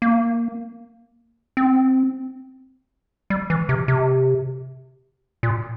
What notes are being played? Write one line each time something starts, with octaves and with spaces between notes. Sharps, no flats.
A#3
C4
G3
E3
C3
C3
A#2